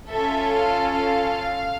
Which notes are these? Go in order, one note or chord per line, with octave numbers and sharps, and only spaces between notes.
C#4 F4 A4 E5
F5
F5